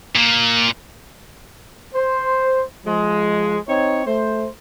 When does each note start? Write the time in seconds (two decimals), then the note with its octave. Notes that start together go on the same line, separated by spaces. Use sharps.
0.16 A#2
1.95 C5
2.86 F3 G#3
3.69 C4 D#4 C#5
4.06 A3 C5